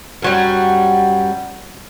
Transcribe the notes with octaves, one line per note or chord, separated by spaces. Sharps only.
F#2 F#3 G3